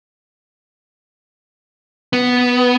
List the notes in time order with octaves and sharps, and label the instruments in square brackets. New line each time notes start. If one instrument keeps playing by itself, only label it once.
[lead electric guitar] B3